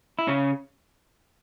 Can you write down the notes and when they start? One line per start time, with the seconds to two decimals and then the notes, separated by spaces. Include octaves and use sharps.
0.19 E4
0.28 C#3 C#4